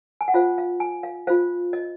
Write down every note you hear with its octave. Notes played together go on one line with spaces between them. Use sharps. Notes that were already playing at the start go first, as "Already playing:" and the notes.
G#5
F#5
F4 C5 F5
F5
G#5
F5
F4 C5 F5
D#5